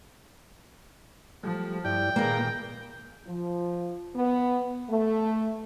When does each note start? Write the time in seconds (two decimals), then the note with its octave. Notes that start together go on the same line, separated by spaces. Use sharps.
1.43 F3 G3 A3
1.85 G2 E4 D5 G5
2.16 A#2 D#3 A#3 G#4 A#4 B4 A#5
3.27 F3
4.16 B3
4.90 A3